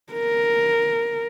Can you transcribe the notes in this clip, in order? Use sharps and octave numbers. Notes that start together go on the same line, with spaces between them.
A#4